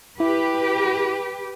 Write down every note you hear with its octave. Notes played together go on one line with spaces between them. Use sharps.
E4 G4 B4